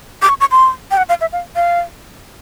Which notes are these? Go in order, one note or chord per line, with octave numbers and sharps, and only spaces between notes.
D6
C#6
C#6
C6
G5
F#5
F5
E5
F5
F5